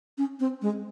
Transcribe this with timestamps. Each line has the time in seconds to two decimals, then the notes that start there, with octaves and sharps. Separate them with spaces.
0.18 C#4
0.40 C4
0.62 G#3